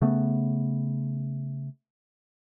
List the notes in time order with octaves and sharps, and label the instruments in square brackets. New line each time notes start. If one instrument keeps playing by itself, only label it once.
[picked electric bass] C#3 A3 B3